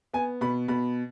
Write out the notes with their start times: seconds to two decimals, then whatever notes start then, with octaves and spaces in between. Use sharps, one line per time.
0.13 B3 G#5
0.41 B2 B5
0.68 B2 B5